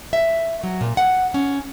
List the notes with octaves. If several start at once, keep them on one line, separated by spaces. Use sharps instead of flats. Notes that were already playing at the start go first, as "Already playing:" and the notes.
E5
F#3
A#2
F#5
C#4